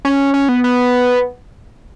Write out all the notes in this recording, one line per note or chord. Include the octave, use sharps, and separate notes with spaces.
C#4
C#4
B3
B3